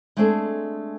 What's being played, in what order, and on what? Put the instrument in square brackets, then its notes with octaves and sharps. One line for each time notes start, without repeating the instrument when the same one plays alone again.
[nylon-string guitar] G#3 A3 C4 D4 G#4 A4